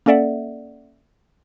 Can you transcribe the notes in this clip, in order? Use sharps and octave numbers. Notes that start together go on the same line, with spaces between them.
A#3 C#4 A4 D5 E5 F#5